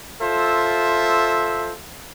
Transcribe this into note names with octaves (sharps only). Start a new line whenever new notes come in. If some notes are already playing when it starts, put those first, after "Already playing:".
F4 A4 C5 E5